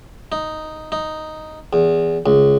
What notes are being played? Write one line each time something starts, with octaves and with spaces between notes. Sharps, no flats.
D#4
D#4
E2
C#2